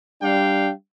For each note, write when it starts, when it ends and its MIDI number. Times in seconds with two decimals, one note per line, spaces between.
0.22 0.71 55
0.22 0.71 62
0.22 0.71 77
0.22 0.71 79